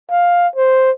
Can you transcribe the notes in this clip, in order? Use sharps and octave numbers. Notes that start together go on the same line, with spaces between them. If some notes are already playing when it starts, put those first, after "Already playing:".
F5
C5